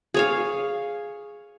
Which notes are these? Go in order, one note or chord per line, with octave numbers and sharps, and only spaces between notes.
G#4 C#5 F5